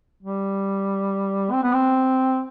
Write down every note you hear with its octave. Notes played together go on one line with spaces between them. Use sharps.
G3
C4
B3
C4